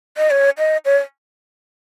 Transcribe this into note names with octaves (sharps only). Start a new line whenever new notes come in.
D#5
C#5
D#5
C#5